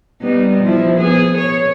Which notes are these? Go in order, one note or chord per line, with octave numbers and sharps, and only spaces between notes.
G3 B3 D#4
F3 E4
B3 G#4
C#5